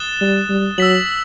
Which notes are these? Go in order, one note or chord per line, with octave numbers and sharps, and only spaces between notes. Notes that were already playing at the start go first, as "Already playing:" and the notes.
Already playing: D#6 F#6 A6 E7 G7
G3
G3
F#3 E6 B6 F#7